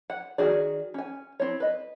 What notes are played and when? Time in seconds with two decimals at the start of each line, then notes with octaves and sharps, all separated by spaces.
0.10 F#5
0.38 D#3 F#4 G#4 D5
0.94 C#4 G#5
1.40 C4 E4 C#5
1.60 B4 D#5